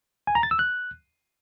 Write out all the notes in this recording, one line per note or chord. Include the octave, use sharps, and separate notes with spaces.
G#5
A#5
A6
E6
F#6